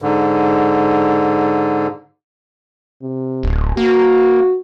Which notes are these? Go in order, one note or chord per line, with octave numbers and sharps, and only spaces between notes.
G#2 D3
C3
D1
A#3 F#4